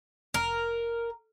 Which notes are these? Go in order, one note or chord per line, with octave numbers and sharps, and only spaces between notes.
F1 A#4